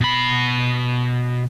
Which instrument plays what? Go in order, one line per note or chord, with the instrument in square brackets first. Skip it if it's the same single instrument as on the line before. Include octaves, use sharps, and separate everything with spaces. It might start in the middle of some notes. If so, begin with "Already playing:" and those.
[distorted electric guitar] B2 B5